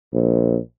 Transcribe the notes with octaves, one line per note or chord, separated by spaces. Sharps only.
A#1